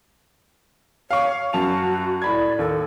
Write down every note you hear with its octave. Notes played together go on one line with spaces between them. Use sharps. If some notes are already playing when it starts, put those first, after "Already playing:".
C#5 F5 C#6
F#2 F#4 A5 F7
A2 D5 B5 G#6
D#2 A4